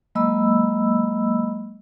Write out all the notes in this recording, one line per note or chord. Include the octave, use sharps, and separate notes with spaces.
F#3 G#3 A#3 D#5 B5 E6